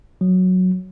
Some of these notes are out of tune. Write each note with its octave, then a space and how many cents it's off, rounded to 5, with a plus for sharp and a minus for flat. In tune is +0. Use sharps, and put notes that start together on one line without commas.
F#3 -5